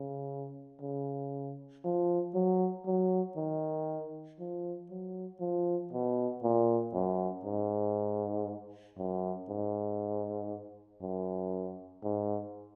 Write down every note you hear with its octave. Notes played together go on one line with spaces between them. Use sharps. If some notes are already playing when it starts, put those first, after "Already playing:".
Already playing: C#3
C#3
F3
F#3
F#3
D#3
F3
F#3
F3
B2
A#2
F#2
G#2
F#2
G#2
F#2
G#2